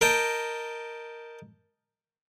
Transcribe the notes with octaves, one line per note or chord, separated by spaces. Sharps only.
A#4 D#5 G5 A5